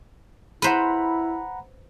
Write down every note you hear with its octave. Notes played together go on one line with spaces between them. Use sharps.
E4 B4 C5 F#5 A#5 B5